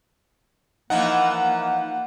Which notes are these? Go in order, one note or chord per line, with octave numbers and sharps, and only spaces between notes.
E3 F3 A#3 D#4 F#5